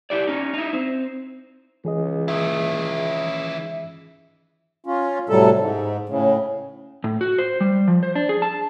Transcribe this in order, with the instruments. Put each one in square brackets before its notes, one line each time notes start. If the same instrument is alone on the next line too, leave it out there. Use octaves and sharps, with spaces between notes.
[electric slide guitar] E4 G4 D5
C#4 D#4
D#4 E4
C4
[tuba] C#2 [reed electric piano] E3 G#4 D#5
[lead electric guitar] D#3 E4
[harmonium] C#4 F4
A2 C3 F#3 G3 A4
G#2
A2 C#3
[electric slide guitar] A2
F#4
C5
G3
F3
C5
D4
G#4
A5